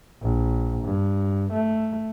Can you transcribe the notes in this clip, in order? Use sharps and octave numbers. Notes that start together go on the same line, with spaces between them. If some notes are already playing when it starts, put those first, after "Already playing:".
A#1
G2
A3